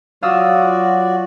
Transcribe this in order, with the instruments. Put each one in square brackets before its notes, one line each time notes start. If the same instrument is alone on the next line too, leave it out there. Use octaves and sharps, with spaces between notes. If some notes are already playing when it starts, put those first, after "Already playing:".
[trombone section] F#3 F4 [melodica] F#4 D5 [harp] F5 D#6 E6